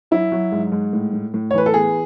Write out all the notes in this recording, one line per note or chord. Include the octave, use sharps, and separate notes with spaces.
F#3 E4
F#3
G#2
G#2
A2
A2
A2
C#5
E3 B4
A4
B3 G#4